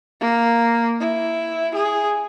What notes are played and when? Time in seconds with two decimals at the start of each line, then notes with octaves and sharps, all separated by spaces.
0.21 A#3
1.00 E4
1.74 G#4